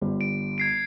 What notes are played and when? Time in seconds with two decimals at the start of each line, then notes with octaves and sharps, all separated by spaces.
0.01 G1 G3
0.21 D7
0.58 G#6 C7 D7